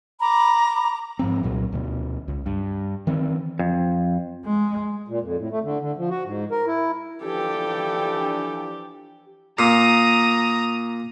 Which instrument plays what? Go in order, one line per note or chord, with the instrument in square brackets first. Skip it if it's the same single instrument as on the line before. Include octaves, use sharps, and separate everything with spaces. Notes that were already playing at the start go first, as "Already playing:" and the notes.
[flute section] A#5 B5 D6
[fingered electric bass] G#2 F3 C4
C2 A#2 F#3
D2 B2
C#2
G2
D#3 E3 C4
[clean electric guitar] F2
[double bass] G#3
[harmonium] A#2
F2
A2
A3
D3
D3
F3
F#4
G#2
A#4
E4
[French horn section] E3 F3 D4 [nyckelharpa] G4 [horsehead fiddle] A4 G5
[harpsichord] A#2 [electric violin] A#5 D#6